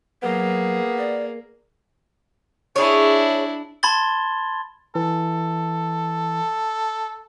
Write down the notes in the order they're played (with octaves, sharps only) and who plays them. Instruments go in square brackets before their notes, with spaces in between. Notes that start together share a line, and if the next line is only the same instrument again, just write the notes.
[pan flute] F#3 [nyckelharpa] A#3 G#4 [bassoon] B3
[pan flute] D5
[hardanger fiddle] D4 E4 [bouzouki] G#4 C#5
[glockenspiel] A5 B5 C6 G#6 A6 G7
[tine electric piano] E3 [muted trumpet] A4